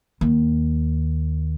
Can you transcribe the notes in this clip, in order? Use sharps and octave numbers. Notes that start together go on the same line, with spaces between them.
D#2